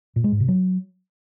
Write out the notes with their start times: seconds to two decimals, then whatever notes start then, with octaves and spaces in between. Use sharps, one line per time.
0.16 A#2
0.24 G#3
0.32 G#2
0.40 C3
0.48 F#3